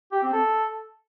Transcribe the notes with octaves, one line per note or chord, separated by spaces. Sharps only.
G4
C4
A4